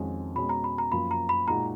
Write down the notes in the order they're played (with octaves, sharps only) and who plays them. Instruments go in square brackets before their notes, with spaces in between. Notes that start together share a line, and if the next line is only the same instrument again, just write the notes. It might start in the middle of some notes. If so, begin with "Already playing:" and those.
Already playing: [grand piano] F2 D#3 G#3 C#4 F#4
[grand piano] B2 G#3 C#4 [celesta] B5
[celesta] A#5
B5
A#5
[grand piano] F#2 F3 A#3 F4 [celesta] B5
[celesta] A#5
B5
[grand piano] A#2 G#3 D#4 F#4 [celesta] A#5